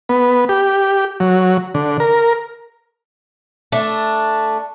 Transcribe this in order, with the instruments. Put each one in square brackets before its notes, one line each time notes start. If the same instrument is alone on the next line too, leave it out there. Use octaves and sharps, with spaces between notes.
[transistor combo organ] B3
G4
F#3
D3
A#4
[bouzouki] A3 D4